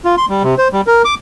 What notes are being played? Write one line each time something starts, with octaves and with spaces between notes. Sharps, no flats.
F4
C6
G3
C3
C5
G3
A#4
D6